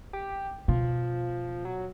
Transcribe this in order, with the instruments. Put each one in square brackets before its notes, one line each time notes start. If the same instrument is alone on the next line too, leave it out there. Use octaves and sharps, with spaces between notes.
[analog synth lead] G4
[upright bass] B2 [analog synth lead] F3
[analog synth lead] F#3